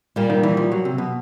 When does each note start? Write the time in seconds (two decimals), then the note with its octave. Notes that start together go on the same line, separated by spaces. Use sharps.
0.16 A#2 G3 A#3
0.30 D#3
0.43 E3
0.57 F3
0.72 F#3
0.85 C3
0.98 B2